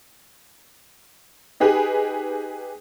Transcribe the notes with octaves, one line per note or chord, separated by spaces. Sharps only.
D#4 G4 G#4 B4